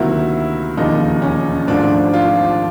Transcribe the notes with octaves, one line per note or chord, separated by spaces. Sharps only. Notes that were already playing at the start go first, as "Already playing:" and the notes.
Already playing: D2 C3 D#3 F#3 A#3 E4
E1 D#2 C#3 F3 D#4
C#4
G#1 G#2 F3 A3 D4
F4